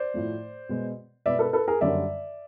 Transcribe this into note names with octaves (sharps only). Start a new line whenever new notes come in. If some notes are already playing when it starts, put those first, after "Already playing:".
Already playing: C5 D5
A2 F3 A3
B2 G#3 B3
B2 G#3 B3 D5 E5
A4 B4
A4 B4
G#4 A#4
F#2 D3 G3 A#3 C#4 D5 E5